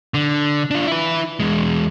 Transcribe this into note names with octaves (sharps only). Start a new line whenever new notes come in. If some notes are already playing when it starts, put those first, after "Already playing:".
D3
D4 F4
E4 B4
E2 G#3